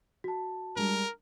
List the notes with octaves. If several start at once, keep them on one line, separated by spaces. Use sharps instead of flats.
F#4 A5
G3 G#3 D4 A#4